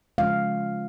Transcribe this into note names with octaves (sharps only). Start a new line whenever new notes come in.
C#3 F3 G#3 C#4 F4 F5